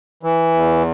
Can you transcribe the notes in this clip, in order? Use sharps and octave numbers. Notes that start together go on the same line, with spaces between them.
E3
E2